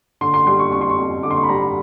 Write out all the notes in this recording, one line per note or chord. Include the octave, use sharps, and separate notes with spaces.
D3 C6
C6
G3 C6
C#6
F2 C#6
C6
C#6
F2
D3 D6
C6
C#6
B5
G3 A#5
B5